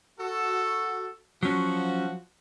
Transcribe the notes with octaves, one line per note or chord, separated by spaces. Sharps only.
F#4 A4
F3 F#3 C#4 F#4